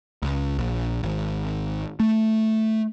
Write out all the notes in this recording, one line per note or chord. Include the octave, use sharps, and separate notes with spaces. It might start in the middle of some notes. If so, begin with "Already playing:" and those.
C#2
A#1
G#1
A3